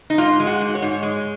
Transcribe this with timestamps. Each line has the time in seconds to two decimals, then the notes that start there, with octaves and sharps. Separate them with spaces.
0.10 D#4
0.18 G#2 F4
0.40 G#3
0.47 F#4
0.61 G#2
0.75 C#5
0.82 G#2
1.03 G#3